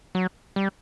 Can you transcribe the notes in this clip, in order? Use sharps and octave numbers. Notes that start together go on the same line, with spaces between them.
F#3
G3